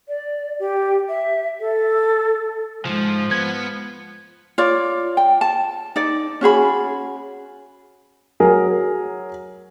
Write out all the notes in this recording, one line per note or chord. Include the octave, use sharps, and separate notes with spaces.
D5
G4
E5
A4
C#2 G#2 F3 G#3
B3 G#6
F4 C#5 D5
G5
A5
D#4 D5
C#4 F#4 G#4 B5
F#3 G#4 A#4